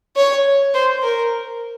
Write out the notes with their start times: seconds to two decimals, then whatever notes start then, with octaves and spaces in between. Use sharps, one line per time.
0.17 C#5
0.75 C5
1.03 A#4